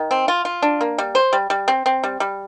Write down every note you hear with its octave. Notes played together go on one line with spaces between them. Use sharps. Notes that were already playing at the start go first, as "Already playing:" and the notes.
Already playing: D#3
C4
F4
F4
D4
A#3
G3
C5
G3
G3
C4
C4
G3
G3